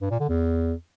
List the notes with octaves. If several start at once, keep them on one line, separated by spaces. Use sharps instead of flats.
G2
A#2
D3
E2